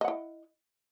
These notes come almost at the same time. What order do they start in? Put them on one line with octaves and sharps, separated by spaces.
D#5 F#5 E4